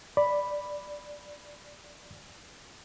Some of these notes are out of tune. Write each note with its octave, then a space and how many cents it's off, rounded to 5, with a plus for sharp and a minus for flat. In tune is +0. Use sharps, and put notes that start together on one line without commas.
D5 +0 B5 +0